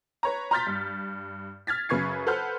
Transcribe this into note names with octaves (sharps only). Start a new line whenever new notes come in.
B4 C#5 A#5
A#5 C6 F6 G6 A6 B6
G2
F6 G#6 A6 B6
F#2 C#3 B4 C#6 G#6 C7
A4 B4 C5 F#5 F6 G6